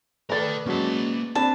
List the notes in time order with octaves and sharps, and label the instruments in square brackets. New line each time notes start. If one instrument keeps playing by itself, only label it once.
[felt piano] A3 [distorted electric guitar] A#4 G5 [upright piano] B4 D5 A6
[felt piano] F#3 G#3 C#4 [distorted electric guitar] A#3 A5
[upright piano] C4 B5 [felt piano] D4 [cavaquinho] A5